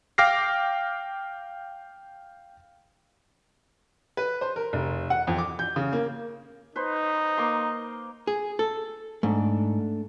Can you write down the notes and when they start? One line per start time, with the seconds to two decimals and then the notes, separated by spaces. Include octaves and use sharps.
0.18 F5 G5 D6 F6 A#6 C7
4.17 B4
4.41 C5
4.56 A#4
4.73 F1
5.10 F#5
5.27 F2
5.38 D6
5.59 G6
5.76 C#3
5.93 A#3
6.76 D#4 B4 C5
7.38 A#3 C6
8.27 G#4
8.59 A4
9.23 G#2 A3 D4 A4